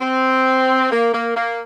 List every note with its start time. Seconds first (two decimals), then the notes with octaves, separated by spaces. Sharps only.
0.01 C4
0.91 A#3
1.14 A#3
1.36 A#3